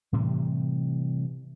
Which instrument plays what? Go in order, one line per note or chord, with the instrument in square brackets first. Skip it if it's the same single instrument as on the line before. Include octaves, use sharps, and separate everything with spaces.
[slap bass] A2 C3 E3 G3